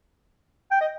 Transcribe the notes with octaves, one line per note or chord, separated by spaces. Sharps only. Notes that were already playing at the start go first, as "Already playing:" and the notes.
G5
D#5